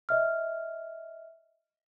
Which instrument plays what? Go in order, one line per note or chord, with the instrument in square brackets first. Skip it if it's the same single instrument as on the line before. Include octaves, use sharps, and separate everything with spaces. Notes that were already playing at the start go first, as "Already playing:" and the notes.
[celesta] D#5 E5 F6